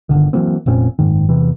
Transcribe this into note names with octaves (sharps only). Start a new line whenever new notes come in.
G1 D#2 D3 D#3
E3 F#3 A#3 C4
F1 A#2 C4 C#4
F#1 G#2 D#3
E2 C3 E3